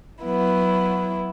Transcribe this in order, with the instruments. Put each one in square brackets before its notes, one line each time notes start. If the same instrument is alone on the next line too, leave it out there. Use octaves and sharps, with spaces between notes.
[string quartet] F#3 B3 E4